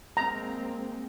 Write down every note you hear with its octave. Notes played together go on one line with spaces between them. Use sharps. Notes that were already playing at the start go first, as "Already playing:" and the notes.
G#3 A#3 C4 A#5